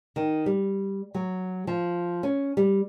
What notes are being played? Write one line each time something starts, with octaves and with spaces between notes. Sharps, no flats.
D#3
G3
F#3
F3
C#4
G3